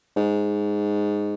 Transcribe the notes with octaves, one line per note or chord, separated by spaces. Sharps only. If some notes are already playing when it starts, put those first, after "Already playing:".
G#2